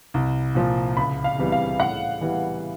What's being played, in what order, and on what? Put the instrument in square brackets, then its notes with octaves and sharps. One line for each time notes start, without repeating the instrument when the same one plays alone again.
[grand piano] C2
A#2 F3
[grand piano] C#2 [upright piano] B5
[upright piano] F5
[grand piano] C3 E3 G3 B3
[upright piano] F5
[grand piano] A2 [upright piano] F#5
[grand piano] E3 G3 B3